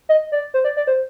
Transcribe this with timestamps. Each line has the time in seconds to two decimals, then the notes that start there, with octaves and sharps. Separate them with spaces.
0.09 D#5
0.32 D5
0.54 C5
0.64 D5
0.77 D5
0.87 C5